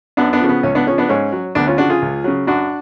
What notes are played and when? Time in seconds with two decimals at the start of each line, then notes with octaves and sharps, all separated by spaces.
0.17 F#2 B3 D4
0.33 B3 D4
0.40 C#3 F3
0.49 B3
0.63 C#2 C#4
0.75 B3 D4
0.87 C#3 F3 C#4
0.98 B3 D4
1.09 G#2 C#4
1.32 F#3
1.55 D2 B3 D4
1.67 C#4 F4
1.78 C#3 F3 D4 F#4
1.90 F4 G#4
2.02 C#2
2.24 C#3 F#3
2.47 F#2 D4 F#4